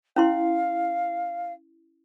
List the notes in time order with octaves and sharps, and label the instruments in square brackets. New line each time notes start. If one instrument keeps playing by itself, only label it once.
[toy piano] C#4 E4 C6 [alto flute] F5